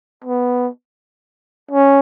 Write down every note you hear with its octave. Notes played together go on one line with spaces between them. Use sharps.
B3
C#4